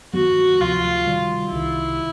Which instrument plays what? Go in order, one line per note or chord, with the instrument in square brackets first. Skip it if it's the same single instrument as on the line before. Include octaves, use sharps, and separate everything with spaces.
[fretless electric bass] G2 D#3 F#3 B3 [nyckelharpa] F#4
[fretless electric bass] D2 C3 F3 [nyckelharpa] F4
[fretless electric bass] C3 D#3 G3
[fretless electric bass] C2 C3 D#3 [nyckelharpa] E4